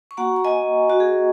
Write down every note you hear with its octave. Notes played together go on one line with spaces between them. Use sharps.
C#6
A#3 F#4 F#5 A#5
A#5
D#5 G#5
F#4
G#4